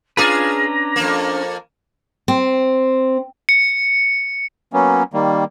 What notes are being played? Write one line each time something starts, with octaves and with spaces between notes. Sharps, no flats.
C#4 D4 F4 G#4 B4 A#5
F2 A#3
C4
C#7
F#3 A#3 B3 C#4
D#3 G3 A#3